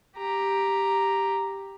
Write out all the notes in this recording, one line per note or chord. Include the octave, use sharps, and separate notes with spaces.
G4 A#5